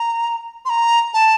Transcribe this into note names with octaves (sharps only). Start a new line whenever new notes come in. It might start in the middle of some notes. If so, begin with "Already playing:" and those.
Already playing: A#5
C6
A#5
A5